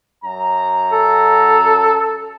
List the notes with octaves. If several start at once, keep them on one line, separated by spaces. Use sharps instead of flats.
F#2 A#5
A4